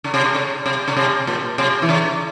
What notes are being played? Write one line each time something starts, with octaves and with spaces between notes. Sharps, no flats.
C#3
C3
C#3
C#3
C3
C#3
C3
A#2
C3
E3
C#3